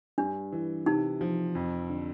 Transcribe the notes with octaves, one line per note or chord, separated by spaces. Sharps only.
G2 D4
E3
C3 D#4
F3
F2
D3